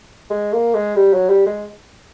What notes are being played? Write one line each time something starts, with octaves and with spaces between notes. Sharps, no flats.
G#3
A#3
G#3
G3
F#3
G3
G#3